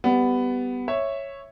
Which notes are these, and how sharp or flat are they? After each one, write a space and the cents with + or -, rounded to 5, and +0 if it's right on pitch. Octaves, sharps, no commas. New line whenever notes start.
G3 +0 B3 +10
C#5 -5 E5 +0